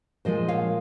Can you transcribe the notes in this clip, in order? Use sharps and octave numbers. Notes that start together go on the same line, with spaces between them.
A#2 F3 G#3 C5 D#5
C#5 F5